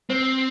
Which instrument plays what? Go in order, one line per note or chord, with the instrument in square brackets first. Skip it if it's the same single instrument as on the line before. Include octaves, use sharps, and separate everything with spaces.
[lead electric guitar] C4 [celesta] C5